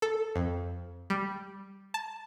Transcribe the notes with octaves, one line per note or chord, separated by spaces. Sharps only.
A4
F2
G3
A5